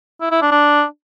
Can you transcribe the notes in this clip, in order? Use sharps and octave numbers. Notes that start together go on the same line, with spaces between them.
E4
E4
D4
D4